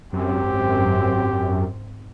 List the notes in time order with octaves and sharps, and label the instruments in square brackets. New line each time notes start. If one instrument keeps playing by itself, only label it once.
[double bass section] G#1 C4 [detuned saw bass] F#2 [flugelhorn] G4